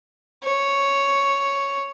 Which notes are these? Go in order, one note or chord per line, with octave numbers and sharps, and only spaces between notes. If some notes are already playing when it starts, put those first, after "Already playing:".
C#5